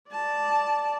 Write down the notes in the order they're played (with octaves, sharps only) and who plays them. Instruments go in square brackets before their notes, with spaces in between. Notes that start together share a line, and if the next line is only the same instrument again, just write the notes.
[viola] D5 A5